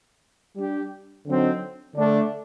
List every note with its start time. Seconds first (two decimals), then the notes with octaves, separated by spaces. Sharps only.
0.56 G3 D4 G4
1.25 D3 F#3 C4 D#4
1.95 D3 A3 D4